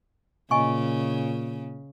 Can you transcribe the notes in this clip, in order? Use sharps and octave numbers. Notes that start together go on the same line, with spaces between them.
A#2 C#3 D#5 G#5 C#6